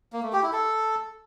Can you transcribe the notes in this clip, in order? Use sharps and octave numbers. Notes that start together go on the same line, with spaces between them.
A#3
A3
G4
E4
A4